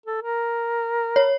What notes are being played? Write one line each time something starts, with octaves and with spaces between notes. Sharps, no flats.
A4
A#4
C#5